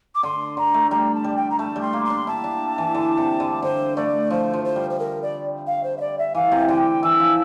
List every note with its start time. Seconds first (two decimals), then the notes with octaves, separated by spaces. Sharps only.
0.14 D6
0.23 D3 C6
0.57 D3 A#5
0.74 A3
0.90 G3 A#5
1.14 A5
1.24 G3
1.36 G5
1.50 A#5
1.58 A3 A5
1.76 G3
1.81 C6
1.93 A#3
2.05 C6
2.10 D4
2.27 E4 A5
2.44 D4
2.78 E3
2.95 D3
3.18 C3
3.40 D3
3.62 D3 C5
3.96 A3 D5
4.30 F3 C5
4.54 F3
4.64 C5
4.76 G3
4.90 C5
4.99 A#4
5.22 D5
5.66 F5
5.83 C5
5.97 E5
6.00 D5
6.18 E5
6.35 E3 F5
6.52 C3
6.68 D3 G5
7.03 E3 E6
7.20 F3